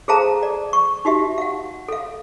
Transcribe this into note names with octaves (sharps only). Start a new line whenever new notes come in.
G#4 A4 C5 F5 A5 A#5
D5
C#6
D#4 F#4 G4 E5
F5 F#5
A4 F5